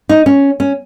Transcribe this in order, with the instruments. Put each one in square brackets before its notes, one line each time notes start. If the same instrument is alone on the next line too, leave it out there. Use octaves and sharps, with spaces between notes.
[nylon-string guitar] D#4
C#4
C#4